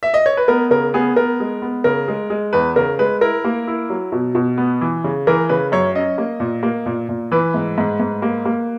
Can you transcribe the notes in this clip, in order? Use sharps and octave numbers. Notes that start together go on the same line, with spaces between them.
E5
D#5
C#5
B4
B3 A#4
C#3 A#4
B3 G#4
B3 A#4
G#3
B3
C#3 A#4
G#3
G#3
E2 B4
C#3 A#4
G#3 B4
E4 A#4
A#3
E4
F#3
B2
B2
B3
E3
C#3
E3 A#4
C#3 B4
F#2 C#5
C#4 D#5
A#3
A#2
A#3
A#2
A#2
E3 B4
G#2
G#2
G#2
A#3
A#3